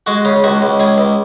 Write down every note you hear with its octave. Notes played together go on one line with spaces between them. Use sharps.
G#3 F#4
C#3
C#2 F#4
C#2
C#2 G#4
C#2